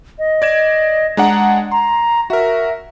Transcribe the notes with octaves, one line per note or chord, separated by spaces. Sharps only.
D#5
D5 G#6 E7
G#3 D4 F#5 A#5
A#5 C6
F#4 A#4 E5